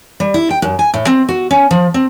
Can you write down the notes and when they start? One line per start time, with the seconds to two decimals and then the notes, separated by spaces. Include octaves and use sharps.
0.20 G3
0.34 E4
0.50 G5
0.62 F#2
0.79 G#5
0.94 A2
1.07 C4
1.29 F#4
1.51 C#4
1.71 F3
1.94 C4